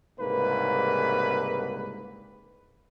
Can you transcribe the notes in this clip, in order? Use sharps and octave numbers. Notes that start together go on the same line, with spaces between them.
C2 G#2 C#3 A#3 B4